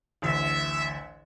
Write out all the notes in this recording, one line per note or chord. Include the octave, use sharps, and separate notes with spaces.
A1 D2 E5